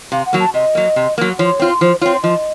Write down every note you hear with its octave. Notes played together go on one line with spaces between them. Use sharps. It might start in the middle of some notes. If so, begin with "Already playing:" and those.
C3 F5
F#5
F#3 A#3
A5
C3 D#5
F#3 A#3
C3
F#3 A#3
F3 C#5
C4 F4
F3 C5
C4 F4 C#5
F3 D#5